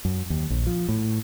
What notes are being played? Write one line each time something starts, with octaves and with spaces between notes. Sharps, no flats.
F#2
D#2
A#1
F3
A2